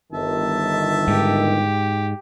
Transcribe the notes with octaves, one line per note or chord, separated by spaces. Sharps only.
G1 D#3 E5 A5
G#2 G4